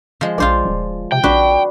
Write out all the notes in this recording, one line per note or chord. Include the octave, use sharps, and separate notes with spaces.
F3 G#3
A#1 F4 C5 D5
D#1
C3 G5
A#1 D4 F#4 B4